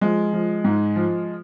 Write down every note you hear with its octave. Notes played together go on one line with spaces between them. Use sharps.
F3 G#3
F3
G#2
F3